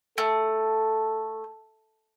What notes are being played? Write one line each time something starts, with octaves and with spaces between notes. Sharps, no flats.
A3 A4